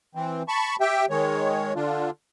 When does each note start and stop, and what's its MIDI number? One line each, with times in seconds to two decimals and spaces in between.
0.15 0.43 52
0.15 0.43 60
0.48 0.76 81
0.48 0.76 83
0.48 0.76 85
0.81 1.06 67
0.81 1.06 76
0.81 1.06 79
1.10 1.73 51
1.10 1.73 56
1.10 1.73 73
1.76 2.10 50
1.76 2.10 62
1.76 2.10 65